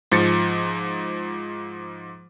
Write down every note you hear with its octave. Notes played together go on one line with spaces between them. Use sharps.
G#2 F3 A6 C#7